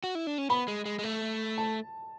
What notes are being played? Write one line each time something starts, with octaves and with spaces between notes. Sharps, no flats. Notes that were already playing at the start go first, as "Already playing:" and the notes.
F#4
E4
D4
C#4
B3 B5
G#3
G#3
G#3
A3
A5